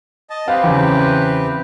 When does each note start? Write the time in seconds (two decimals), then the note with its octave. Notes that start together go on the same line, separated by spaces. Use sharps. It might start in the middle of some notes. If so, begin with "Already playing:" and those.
0.30 D#5 A5
0.48 C4 G4 B4 F5
0.64 E2 C#3